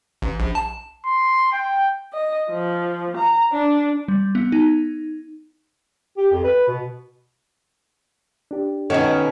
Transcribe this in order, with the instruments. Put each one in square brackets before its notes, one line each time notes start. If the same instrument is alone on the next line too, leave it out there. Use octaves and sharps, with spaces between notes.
[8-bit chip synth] A1
A#1
A5
[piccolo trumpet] C6
G5
[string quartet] D#5
F3
A#5
D4
[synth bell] G3
B3
D#4
[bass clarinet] G4
F2
B4
B2
[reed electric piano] D4 G4
[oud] B2 D#3 [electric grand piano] C#4 C#5 [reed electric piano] A4 F#5